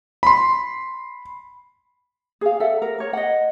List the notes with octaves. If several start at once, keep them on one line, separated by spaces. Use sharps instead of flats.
B5 C6
G#4 F5
A4 E5 F#5
A#4
A#4 C#5
D#5 F#5